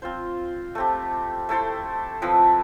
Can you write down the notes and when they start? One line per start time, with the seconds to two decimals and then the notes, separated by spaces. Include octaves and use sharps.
0.02 C4 F4 C5
0.75 A3 C4 G4
1.49 A3 E4 A4 C5
2.22 F3 C4 E4 B4